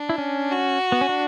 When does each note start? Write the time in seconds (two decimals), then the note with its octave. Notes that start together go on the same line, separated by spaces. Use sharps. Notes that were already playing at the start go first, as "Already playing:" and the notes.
Already playing: D4
0.09 E4
0.18 C#4
0.52 F#4
0.92 B3
1.01 C#4
1.09 D4